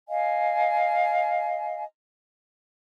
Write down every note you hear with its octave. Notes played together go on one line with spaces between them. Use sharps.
D#5 F5 G#5